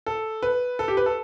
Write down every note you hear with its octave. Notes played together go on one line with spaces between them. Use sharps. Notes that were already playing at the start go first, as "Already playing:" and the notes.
A4
B4
A4
G4
B4
A4